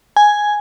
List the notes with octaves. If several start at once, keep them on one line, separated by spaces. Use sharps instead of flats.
G#5